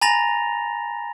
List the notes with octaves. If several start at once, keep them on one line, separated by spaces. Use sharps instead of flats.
G#5 A#5 B5 A6 A#6 F7